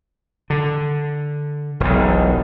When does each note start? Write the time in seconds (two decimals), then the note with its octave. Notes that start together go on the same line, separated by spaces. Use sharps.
0.50 D3
1.80 E1 B1